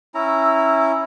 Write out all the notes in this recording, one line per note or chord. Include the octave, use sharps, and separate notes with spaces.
C#4 E4 A#5 E6